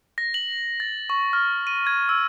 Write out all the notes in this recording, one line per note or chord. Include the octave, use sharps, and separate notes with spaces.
A#6
F#7
A6
C#6
F6
D#7
G#6
E6